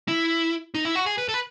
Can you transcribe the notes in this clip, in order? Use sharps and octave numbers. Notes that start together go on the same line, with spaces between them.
E4
D#4
E4
F#4
G#4
B4
A4
B4